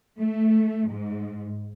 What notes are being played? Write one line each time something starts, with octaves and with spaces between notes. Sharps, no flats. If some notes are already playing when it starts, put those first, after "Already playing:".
A3
G#2